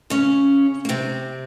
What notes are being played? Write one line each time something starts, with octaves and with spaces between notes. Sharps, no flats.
C#3 C#4
A#3
C3 C4